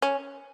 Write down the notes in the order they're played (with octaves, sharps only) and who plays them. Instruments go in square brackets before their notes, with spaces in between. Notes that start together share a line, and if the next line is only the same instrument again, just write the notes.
[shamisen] C#4